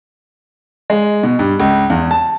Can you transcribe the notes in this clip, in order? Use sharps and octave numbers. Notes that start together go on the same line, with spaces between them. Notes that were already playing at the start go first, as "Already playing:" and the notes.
G#3
B2
G2
C#2
E2
A5